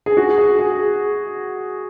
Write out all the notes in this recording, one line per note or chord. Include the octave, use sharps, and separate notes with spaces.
G#4
F#4
G#4
G#4